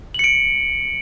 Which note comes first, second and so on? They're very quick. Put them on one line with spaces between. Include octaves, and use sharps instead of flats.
F#7 C#7 D7